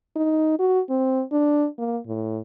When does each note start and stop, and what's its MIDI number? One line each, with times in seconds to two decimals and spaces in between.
0.16 0.58 63
0.59 0.80 66
0.90 1.23 60
1.32 1.67 62
1.78 1.98 58
2.07 2.40 45